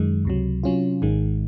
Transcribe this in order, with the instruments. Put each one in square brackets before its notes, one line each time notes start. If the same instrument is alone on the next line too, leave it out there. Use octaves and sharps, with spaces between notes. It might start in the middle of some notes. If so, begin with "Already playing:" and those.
Already playing: [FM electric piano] F#2 D#3 G#3
C#2 C3 F#3
C3 F#3 C#4 F4
G#1 G#2 D#3 G#3